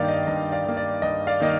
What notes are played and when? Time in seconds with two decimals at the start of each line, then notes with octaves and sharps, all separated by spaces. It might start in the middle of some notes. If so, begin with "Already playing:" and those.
Already playing: G2 D#3 A#3 D5 F5 G5
0.08 D#5
0.27 G2 D#5
0.52 D5 F5
0.65 D#3 A#3
0.77 D5
1.02 G2 D#5
1.27 D5 F5
1.40 D#3 A#3 D#5